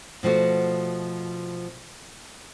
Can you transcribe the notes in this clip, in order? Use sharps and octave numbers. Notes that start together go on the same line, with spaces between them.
B2 F3 A3 F#4